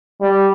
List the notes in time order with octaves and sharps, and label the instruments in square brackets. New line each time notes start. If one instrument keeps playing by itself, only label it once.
[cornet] G3